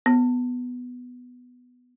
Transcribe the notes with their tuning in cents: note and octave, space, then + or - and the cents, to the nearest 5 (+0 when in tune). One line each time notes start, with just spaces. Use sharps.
B3 +5